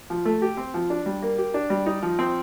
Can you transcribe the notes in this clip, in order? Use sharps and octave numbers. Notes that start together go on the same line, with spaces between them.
F3
A3
G4
C4
F3
D4
G3
A#3
G4
D4
G3
D#4
F3
C4